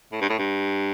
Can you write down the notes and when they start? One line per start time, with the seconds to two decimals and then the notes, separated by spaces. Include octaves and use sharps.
0.12 A2
0.21 G2
0.29 A2
0.39 G2